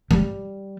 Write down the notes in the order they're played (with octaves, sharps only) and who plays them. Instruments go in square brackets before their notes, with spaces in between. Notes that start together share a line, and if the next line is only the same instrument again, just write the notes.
[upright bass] G3